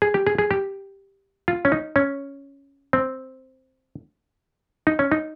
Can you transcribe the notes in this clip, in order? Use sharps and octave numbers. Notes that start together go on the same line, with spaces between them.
G#4
G4
G#4
G#4
G4
F4
C#4
D#4
C#4
C4
D#4
C#4
D#4